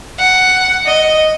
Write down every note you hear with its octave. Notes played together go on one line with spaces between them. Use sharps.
F#5
D#5